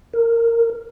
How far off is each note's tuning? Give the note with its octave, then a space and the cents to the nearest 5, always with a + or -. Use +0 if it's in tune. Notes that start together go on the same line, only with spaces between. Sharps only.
A#4 -15